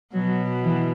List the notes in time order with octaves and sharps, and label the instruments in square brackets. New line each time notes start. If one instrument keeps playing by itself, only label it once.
[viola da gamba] B2 [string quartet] F#3
[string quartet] E3